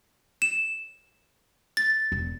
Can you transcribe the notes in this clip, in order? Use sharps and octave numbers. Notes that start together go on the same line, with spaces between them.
E7
A6
E1